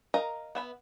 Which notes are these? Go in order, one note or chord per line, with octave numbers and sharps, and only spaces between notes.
A#4 D#5 F5 A#5
B3 E5 B5